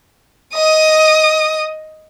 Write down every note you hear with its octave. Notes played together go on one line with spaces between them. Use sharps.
D#5 D#6